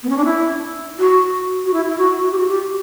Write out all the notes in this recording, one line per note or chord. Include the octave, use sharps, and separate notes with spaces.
B3
C#4
D4
E4
F#4
F#4
E4
E4
F#4
F#4
G4
F#4
G4